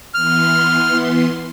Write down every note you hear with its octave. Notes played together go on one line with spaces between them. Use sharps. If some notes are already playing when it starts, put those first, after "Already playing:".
E3 B3 C6 F6